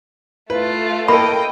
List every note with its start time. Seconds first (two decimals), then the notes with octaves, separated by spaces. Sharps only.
0.50 A3 F4 B4
1.08 A#3 A4 D#5 G5 B5